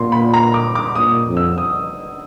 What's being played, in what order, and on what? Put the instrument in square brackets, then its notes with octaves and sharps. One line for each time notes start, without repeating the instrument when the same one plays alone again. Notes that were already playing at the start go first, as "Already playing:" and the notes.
Already playing: [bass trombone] A#2 [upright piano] C6
[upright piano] B5
A#5
D6
D6
[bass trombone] A#2 [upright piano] D#6
[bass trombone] F2
[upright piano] E6
D#6